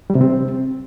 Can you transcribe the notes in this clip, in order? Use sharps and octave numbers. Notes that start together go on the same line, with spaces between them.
G3
C3
C4